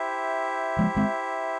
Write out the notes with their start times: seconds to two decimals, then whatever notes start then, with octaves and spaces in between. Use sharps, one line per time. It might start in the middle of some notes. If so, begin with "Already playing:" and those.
Already playing: E4 G4 C5 E5
0.79 F3 G#3
0.97 G#3 C4